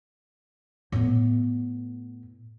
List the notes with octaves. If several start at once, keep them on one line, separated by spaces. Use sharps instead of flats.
A2 B3